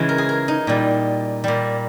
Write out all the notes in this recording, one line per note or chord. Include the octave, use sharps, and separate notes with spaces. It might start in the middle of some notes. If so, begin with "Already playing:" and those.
Already playing: C#3 E3 G#3 E4
A#4
G#4
A#4
D#4
A#2 G3
A#2 G3